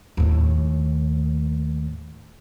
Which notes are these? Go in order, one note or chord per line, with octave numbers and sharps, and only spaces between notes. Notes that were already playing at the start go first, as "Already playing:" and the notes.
D#2 A2